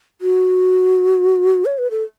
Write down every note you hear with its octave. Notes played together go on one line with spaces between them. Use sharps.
F#4
C#5
B4
A4